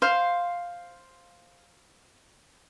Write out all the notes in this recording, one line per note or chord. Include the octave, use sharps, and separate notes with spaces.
C5 F5